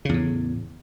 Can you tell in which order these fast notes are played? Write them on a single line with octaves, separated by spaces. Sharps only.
C#3 E2 A2